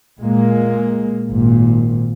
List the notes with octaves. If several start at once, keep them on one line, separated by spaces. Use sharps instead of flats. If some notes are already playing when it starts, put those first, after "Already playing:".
A#2 G#3 A#3
G#1 A#2